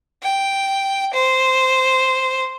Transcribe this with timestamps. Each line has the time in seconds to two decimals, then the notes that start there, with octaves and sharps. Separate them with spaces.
0.23 G5
1.14 C5